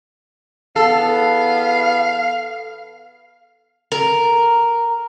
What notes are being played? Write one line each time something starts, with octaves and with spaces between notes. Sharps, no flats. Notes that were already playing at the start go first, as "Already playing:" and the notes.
E2 B3 A4 F5
A#4